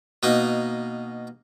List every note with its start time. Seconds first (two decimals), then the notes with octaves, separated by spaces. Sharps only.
0.23 B2 A#3 D#4